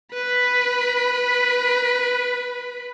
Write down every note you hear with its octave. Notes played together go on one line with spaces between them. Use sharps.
B4 B5